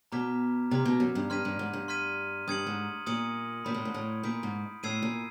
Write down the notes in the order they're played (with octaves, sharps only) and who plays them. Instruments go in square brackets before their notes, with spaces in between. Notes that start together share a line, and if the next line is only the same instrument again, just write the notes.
[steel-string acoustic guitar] B2 [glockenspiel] A#5 D6 F6 G#6 B6
[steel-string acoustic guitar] C3 [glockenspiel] A#5 D6 F6 G#6 B6
[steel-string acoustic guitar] B2
F#2
G2
[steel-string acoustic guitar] G2 [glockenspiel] C6 F6 G#6 B6 D#7
[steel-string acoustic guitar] G2
G#2
G2
[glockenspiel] C6 F6 G#6 B6 D#7
[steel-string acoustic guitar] G2 [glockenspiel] D#6 G#6 C#7 F#7
[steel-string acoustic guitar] G#2
[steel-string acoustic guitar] A#2 [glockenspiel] D#6 G#6 C#7 F#7
[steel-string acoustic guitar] A#2 [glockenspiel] B5 D#6 G6 B6 D7
[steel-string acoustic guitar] A2
G#2
A2
[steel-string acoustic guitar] A#2 [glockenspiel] B5 D#6 G6 B6 D7
[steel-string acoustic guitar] G#2
[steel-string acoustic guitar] A2 [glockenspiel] E6 G#6 C7 D#7
[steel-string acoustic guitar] A#2